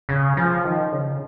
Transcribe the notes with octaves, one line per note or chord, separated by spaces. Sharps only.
C#3
F3
D#3
C#3